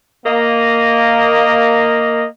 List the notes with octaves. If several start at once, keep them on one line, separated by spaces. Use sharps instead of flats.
A#3 D#5